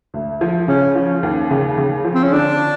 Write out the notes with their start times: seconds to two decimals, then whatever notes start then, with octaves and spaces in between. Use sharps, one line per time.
0.14 D2
0.41 F3
0.68 C#3 C#4
0.95 F3
1.23 D#2
1.51 C#3
1.78 C#3
2.05 F3
2.14 C4
2.24 C#4
2.32 D3 D4